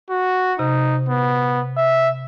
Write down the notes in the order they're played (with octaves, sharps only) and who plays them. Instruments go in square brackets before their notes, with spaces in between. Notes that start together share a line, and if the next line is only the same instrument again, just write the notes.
[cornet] F#4
[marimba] C3 [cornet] D#4
[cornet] B3
E5